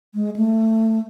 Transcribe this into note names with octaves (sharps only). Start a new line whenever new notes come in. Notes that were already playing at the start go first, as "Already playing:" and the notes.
G#3
A3